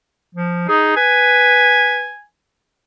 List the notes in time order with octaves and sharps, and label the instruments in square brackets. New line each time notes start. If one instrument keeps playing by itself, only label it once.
[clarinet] F3
[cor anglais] D#4 [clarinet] G#4
[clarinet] B4 [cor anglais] G#5